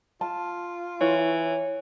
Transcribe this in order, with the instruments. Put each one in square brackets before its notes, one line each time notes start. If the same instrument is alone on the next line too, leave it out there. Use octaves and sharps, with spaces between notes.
[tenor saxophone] F4 [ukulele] A5
[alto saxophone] E3 [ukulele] E4 [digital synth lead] C#5